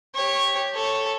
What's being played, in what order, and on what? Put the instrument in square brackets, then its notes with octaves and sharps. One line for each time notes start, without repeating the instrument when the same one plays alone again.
[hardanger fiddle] G4 C#5
A4 C#5